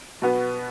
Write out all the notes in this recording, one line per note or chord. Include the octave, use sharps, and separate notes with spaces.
B2 B3